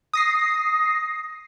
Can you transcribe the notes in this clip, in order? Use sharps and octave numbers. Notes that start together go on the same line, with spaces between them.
D#6 A#6 C7